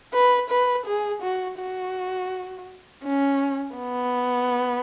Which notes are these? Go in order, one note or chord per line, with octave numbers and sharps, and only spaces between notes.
B4
B4
G#4
F#4
F#4
C#4
B3